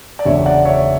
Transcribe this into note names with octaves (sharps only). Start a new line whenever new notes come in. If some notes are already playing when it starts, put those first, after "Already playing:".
D5
F#1 E2 D3 C#5 E5
D5 F#5
C#5 E5